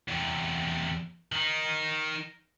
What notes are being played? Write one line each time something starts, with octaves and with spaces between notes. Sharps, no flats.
E2 C3
D#3 D#4